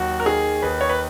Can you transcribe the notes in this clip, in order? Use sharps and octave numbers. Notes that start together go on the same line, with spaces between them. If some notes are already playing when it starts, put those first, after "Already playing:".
Already playing: D#2 F#3 F#4
A#4
D#3 G#4
D#2 B4
C#5
B4